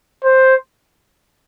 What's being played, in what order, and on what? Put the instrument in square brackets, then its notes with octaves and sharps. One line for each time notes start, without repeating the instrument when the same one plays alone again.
[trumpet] C5